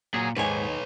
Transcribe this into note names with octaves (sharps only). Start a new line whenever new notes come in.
A#2 F#3 G#4
D#2 G#2 B4 C#5 G#5